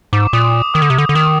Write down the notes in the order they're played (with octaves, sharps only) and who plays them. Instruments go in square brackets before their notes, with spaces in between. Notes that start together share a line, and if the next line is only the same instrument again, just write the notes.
[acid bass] G#2 [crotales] D6
[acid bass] A#2 [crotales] D#6
[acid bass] D#3 [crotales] D#6
[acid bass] D3
C3
D3
D3
[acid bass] D#3 [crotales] D#6